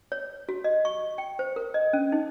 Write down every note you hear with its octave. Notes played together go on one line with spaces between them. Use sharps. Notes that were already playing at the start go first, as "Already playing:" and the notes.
C#5
F#4
D#5
C#6
G5
C5
A#4
D#5
C#4
D#4